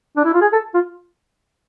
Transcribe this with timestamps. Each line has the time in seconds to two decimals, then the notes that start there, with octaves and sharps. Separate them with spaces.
0.17 D4
0.25 E4
0.34 F4
0.41 G#4
0.53 A4
0.74 F4